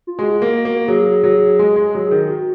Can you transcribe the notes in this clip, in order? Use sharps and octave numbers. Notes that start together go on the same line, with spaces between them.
F4
G#3 F#4
A#3
A#3
F#3 G#4
F#3
G#3
G#3
F#3
D#3
F#4